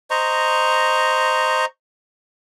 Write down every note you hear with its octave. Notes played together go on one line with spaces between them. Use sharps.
C5 D#5 A#5 C#6